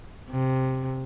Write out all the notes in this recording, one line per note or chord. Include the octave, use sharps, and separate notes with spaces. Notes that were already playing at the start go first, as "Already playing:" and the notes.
C3